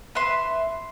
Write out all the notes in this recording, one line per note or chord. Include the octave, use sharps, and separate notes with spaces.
B4 E5 C6